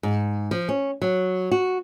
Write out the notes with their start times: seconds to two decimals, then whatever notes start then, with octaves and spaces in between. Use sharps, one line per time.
0.03 G#2
0.51 F3
0.69 C#4
1.02 F#3
1.51 F#4